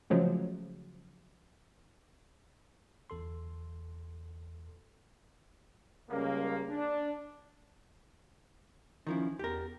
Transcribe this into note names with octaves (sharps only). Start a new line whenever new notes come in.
C#3 F3 F#3 G#3 A3
G1 E2 A4 C6
C#2 C#3 G3 A#3
D4
D#3 F3 C#4 E4
E2 G4 A#4